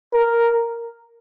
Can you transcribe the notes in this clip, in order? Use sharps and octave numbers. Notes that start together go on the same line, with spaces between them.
A#4